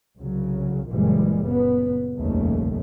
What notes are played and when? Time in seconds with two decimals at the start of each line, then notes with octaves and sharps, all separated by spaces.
0.20 C2 C#3 F#3
0.90 F#1 A#2 E3 F3 G3 G#3
1.46 A#2 C#3 B3
2.18 F1 A#1 D#2 C#3 G3 A3